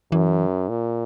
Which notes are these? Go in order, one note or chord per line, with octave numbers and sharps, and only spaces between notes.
F#2 E3
A#2